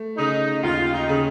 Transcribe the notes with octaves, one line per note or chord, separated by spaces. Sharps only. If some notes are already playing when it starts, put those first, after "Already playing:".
Already playing: A3
C#3 D#4
D#2 F4
D#4
C#3